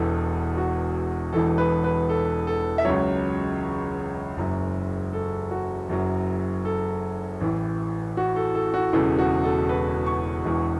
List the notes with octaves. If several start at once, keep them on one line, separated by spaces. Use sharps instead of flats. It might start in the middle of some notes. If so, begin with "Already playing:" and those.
Already playing: E1 E2 E3 A4
F#4
E1 E2 E3 A4
B4
B4
A4
A4
E5
C#2 C#3 F#3 C#5
F#1 F#2 F#3
A4
F#4
F#1 F#2 F#3
A4
A1 A2 E3
F#4
A4
A4
F#4
E1 E2 C#3 E3 A4
F#4
A4
B4
C#6
E1 E2 E3